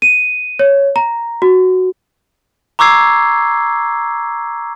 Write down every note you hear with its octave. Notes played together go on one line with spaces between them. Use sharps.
D#7
C#5
A#5
F#4
A#5 C#6 D6 E6 G#6 C7